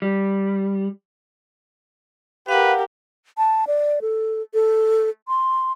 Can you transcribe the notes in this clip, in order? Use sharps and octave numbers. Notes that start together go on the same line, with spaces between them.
G3
G4 A#4 B4 F5 F#5
A5
D5
A4
A4
C6